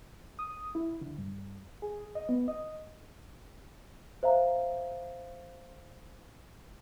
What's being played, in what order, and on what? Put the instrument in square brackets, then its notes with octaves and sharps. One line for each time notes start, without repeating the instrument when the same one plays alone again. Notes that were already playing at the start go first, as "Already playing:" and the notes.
[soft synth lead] D#6
E4
D3
G2
G#4
D#5
B3
D#5
[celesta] C5 E5 F5 A#5